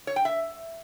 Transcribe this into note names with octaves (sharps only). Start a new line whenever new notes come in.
C#5
G5
E5